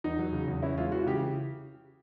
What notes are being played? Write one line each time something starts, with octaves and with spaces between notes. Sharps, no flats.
E2 D#4
F#3
C#3
E2
C#4 E4
G#3 F4
E3 F#4
C#3 G4